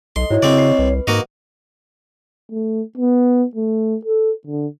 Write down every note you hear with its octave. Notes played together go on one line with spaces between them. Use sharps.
B1 A4 D#5 C6
G#2 E4 F#4 C#5
C#3 C4 D5 D#5 C#6
C7
C2 B4
G#2 A#3 F#4 D#5
A3
B3
A3
A4
D3